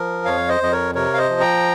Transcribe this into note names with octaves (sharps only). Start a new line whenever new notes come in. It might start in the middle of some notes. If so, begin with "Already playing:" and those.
Already playing: F3 A#4
F2 C#5 F5
C5 D#5
F2 D#5
A#4 C#5
C3 A#4 C#5
F5
C5 D#5
F3
G5 A#5